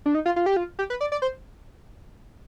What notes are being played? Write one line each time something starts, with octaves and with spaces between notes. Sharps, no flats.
D4
D#4
F4
F4
G4
F4
G4
B4
D5
D5
C5